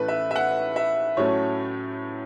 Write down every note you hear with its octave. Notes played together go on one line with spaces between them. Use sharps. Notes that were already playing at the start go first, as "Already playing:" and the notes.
Already playing: A2 E3 A3 C#4 B4
E5
E5
F#5
E5
A2 F#3 A3 C#4 C#5